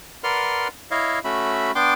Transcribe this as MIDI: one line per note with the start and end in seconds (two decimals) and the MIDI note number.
0.24 0.68 70
0.24 0.68 71
0.24 0.68 74
0.24 0.68 78
0.24 0.68 84
0.24 0.68 89
0.91 1.19 64
0.91 1.19 73
0.91 1.19 75
0.91 1.19 77
1.24 1.71 57
1.24 1.71 61
1.24 1.71 66
1.24 1.71 76
1.24 1.71 83
1.75 1.94 59
1.75 1.94 62
1.75 1.94 79
1.75 1.94 84
1.75 1.94 86